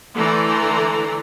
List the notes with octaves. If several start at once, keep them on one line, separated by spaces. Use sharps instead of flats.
D3 E3 A3 D5 A#5 C6